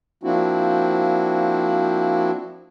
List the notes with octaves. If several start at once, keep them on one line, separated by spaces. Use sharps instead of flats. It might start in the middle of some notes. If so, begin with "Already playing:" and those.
F3 A#3 C4 D4 E4 F#4